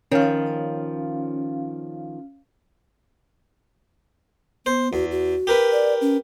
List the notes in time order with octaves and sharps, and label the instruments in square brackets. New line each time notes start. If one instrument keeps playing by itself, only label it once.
[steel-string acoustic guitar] D#3 F3 [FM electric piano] C#4 F5
[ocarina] B3 [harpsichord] C5
[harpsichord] E2 [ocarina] F#4
[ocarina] F#4
[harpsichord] G4 A#4 B4
[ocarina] D5
C#4